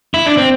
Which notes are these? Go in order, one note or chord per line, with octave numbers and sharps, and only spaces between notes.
E4
D4
C4